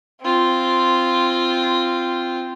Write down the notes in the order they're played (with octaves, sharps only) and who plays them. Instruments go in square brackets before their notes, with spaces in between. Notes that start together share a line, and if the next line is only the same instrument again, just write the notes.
[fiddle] C4 F4